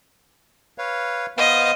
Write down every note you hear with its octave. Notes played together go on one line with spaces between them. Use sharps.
B4 C#5 F5
B3 C5 D#5 F5